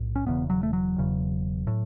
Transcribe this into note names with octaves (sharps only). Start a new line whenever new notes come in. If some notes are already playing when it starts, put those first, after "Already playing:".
Already playing: B1 A2
C#4
E1 E2 C#3 B3
F#3
A3
F#3
E1 E2 C#3
A2